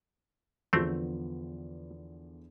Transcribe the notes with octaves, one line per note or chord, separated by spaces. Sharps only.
E2 D3 F3 A3 B3 C4